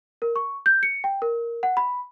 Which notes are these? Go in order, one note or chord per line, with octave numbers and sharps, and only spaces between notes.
A#4
C#6
G6
C#7
G5
A#4
F#5
B5